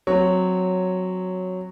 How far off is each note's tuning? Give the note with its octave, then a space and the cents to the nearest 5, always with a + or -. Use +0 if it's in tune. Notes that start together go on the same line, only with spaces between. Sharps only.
F#3 -5 C4 +0 C#5 +0